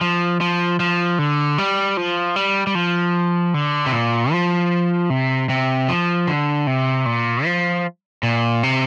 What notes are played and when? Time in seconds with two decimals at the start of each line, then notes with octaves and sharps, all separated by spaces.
0.01 F3
0.41 F3
0.80 F3
1.19 D3
1.58 G3
1.97 F3
2.36 G3
2.67 G3
2.75 F3
3.54 D3
3.86 C3
3.92 A#2
4.32 F3
5.10 C3
5.49 C3
5.89 F3
6.27 D3
6.67 C3
7.06 A#2
7.45 F3
8.23 A#2
8.63 C3